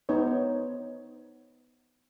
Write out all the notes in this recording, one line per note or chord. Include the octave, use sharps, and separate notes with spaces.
B3 D#4 C5 C#5